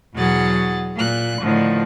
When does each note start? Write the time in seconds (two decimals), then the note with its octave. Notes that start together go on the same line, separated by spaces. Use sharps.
0.15 E2 B2 F#3 G#4 F#5 A6
0.96 A#2 F#6
1.41 A2 D3 D#3 F3